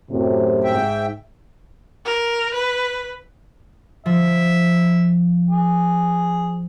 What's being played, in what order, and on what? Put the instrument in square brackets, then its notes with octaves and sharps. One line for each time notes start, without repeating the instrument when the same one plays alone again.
[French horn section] F#2 A2 C3
[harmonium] G#2 E5 G5
[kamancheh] A#4
B4
[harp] F3 [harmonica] E5
[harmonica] G#4